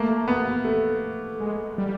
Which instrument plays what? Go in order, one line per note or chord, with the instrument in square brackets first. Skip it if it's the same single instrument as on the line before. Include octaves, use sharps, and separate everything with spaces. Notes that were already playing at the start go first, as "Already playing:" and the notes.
Already playing: [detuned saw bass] A3 [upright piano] A#3
[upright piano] B3
A3
[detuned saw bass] G#3
G3